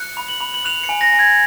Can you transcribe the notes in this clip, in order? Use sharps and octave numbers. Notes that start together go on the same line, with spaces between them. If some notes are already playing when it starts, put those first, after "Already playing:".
Already playing: F#6 C#7
B5
F#7
B5
F#7
F#6 F7
C#7
G#5
A#6
G#5
G#6